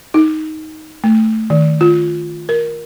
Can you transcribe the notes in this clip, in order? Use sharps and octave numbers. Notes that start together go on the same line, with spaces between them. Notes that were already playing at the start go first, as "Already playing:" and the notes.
D#4
A3
D#3
F4
A#4